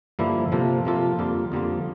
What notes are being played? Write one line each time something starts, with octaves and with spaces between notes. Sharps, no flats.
G2 D3 F3 A#3 E4
C3 F3 A#3 F4 A4
C3 F3 A#3 F4 A4
F2 D3 G3 A#3 F4
F2 D3 G3 A#3 F4